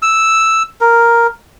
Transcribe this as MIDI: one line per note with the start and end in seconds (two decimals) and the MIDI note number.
0.02 0.63 88
0.81 1.27 70